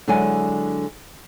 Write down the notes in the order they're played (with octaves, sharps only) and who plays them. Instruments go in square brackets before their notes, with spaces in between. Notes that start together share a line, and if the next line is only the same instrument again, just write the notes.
[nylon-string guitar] D3 F#3 G#3 E4 D5 G#5